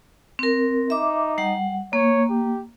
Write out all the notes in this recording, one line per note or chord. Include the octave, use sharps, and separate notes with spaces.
C4 A#4
D#4 E5 D6
G3 F#5
A#3 C#5
G4